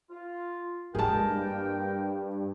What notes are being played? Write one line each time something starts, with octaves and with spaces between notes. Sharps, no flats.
F4
G2 G#3 A#3 E4 G#4 A#4 G5 A5